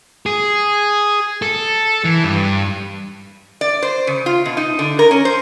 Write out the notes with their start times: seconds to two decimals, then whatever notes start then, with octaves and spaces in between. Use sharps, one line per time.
0.26 G#4
1.42 A4
2.04 E3
2.24 G2
3.61 D5
3.82 C5
4.07 C#3
4.26 F4
4.45 B2
4.57 D#4
4.79 D3
4.99 A#4
5.11 C#4
5.25 C5